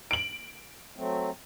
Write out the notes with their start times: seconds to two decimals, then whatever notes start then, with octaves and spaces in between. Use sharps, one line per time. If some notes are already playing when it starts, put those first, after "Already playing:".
0.11 D7 F#7
0.96 F#3 A3 C4